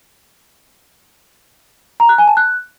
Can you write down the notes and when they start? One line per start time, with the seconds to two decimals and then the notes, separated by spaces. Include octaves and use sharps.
2.00 A#5
2.09 F#6
2.18 G#5
2.28 A5
2.37 F#6